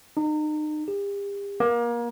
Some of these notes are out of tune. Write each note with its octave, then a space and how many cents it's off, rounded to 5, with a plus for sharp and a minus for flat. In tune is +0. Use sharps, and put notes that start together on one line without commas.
D#4 -35
G4 +40
A#3 +30